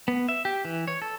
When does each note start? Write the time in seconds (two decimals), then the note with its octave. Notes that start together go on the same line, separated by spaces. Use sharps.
0.08 B3
0.29 E5
0.45 G4
0.65 E3
0.88 C#5
1.02 A4